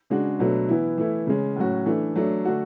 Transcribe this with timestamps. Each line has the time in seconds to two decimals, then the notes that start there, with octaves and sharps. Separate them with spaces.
0.10 C#3 G#3 D4 F#4
0.39 B2 F#3 A3 D4
0.69 E3 B3 E4
0.98 E3 A3 E4
1.27 C#3 G#3 C#4
1.56 A2 F#3 C#4 F#4
1.86 E3 A3 D4
2.16 F#3 A3 D4
2.45 D3 A3 D4 F#4